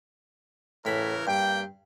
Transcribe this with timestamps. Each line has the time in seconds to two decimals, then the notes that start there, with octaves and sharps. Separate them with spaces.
0.85 A2 C#3 E3 A#4 B5
1.27 G2 A#3 G5